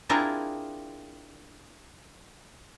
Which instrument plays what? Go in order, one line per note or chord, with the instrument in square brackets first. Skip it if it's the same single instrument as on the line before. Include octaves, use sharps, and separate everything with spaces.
[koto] C4 D4 E4 F4 G#4 A#4